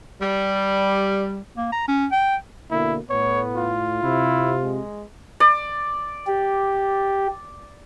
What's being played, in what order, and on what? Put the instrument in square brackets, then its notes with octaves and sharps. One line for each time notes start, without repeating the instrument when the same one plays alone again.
[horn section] G3
[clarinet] A#3
A#5
C#4
G5
[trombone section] B2 D3 A#3 [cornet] E4
[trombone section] A2 [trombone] B3 [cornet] C#5
[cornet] F4
[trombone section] C3 [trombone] E4
[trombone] G#3
[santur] D5
[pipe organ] G4